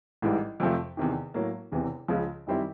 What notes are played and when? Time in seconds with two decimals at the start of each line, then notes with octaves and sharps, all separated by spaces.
0.22 A1 G#2 E3 G3
0.60 F2 C3 F3 A3
0.97 E2 C3 D#3
1.34 A2 F#3 A#3
1.72 E1 E2 C3 E3
2.08 C#2 C#3 F3
2.47 F#2 D#3 G3 C4 E4